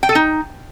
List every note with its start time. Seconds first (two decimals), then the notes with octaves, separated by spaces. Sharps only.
0.03 G5
0.09 A4
0.15 D#4